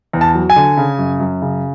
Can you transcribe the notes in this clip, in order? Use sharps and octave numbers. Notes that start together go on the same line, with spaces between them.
E2
A5
F#3
G#5
D3
C#3
F#2
F#2
C#3